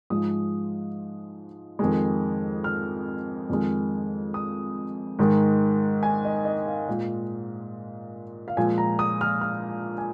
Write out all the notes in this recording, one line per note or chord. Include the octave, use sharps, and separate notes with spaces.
G#2 F3 G#3 D#6
F2 D#3 G#3
F6
F2 D#3 G#3
D#6
G#2 D#3 G#3
G#5
D#5
D#5
F5
A#2 G#3
F5
A#2 F3 G#3 G#5
A#5
D#6
F6
F6
G#5